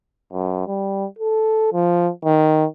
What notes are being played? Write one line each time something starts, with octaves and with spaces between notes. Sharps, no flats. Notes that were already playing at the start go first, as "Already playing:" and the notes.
F#2
G3
A4
F3
D#3